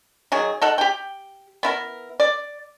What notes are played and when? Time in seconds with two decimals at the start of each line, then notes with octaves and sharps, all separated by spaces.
0.32 D#3 F#3 G#4
0.62 D#4 A4 F#5
0.78 G4 G5
1.63 B3 E4 A#4
2.20 D5